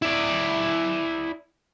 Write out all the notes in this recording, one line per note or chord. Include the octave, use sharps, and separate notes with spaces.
E4 D5